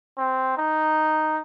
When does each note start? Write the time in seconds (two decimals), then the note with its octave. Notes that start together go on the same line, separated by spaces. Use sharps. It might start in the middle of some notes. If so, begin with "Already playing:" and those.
0.18 C4
0.57 D#4